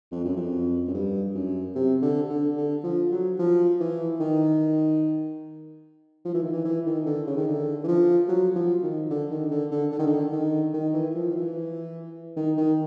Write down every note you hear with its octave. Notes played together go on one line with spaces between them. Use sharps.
F2
F#2
F2
F#2
G2
F#2
C3
D3
D3
D3
F3
F#3
F3
E3
D#3
F3
E3
D#3
E3
E3
D#3
D3
C#3
D#3
D3
E3
F3
F#3
F3
D#3
D3
D#3
D3
D3
D3
D#3
D3
D#3
D#3
E3
F3
F3
E3
D#3
D#3